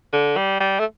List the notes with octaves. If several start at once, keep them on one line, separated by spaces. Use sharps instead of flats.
D3
G3
G3
A3